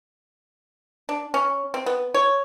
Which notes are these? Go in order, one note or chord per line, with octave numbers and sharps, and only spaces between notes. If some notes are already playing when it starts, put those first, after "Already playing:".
D4
C#4
C4
B3
C#5